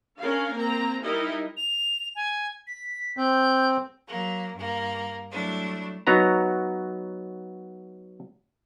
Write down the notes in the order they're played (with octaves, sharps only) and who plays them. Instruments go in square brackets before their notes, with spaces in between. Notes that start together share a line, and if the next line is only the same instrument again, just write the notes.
[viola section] C#4 D4 A#4 F5
A#3 C4 A#5
G3 D#4 E4 A#4 D#5
[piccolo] F7
G#5
B6
[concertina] C4 [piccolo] G6
[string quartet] F#3 A#3
G2 A#3
F#3 G3 A3 D4 E4
[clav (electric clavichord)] F#3 B3 D#4 C#5 A#5